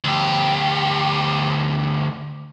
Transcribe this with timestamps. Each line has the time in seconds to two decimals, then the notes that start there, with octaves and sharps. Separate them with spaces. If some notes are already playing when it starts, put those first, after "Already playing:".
0.04 D2 G4